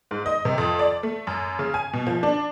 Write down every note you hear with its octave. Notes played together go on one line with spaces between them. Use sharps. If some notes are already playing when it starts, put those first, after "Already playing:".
G#2
D#5
C3
F2
D5
A3
F#2
C#3
G#5
B2
F3
D4